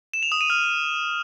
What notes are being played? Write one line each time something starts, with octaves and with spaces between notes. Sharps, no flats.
E7
F7
D#6
D#7
F6